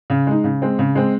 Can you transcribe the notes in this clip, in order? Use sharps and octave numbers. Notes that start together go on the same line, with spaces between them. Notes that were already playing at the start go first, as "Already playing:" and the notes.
C#3
G#3 D#4
C#3
G#3 C4
C#3
G#3 C4